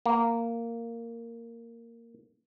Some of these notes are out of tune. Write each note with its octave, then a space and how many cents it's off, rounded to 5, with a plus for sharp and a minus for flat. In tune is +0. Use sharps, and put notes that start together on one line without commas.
A#3 -10